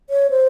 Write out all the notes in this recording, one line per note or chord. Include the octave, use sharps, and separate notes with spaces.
C#5
C5